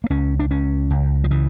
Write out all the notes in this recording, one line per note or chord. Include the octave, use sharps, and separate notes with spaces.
A#3
C#2 C#4
D4
C#2 C#4
C#2
F3
C#3 E3